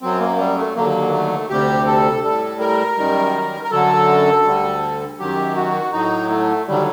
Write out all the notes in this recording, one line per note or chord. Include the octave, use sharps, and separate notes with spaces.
F#2 F#3 C4
A#3
G3
A3
D#2 D3 F#3 A#3
A3
D2 C3 G3 G4
A4
A2 G3 A4
A#4
F#2 D#3 G3
A#4
F#2 D3 F#3 A4
D2 D3 G3
F#2 D#3 F#3 G4
F#4
A2 F#3 D#4
A3
D#2 D3 F#3 G3